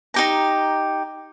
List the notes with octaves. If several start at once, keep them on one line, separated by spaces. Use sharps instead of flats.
D#4 G4 A#5